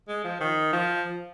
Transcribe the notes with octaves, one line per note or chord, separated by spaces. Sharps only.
G#3
F3
D#3
F3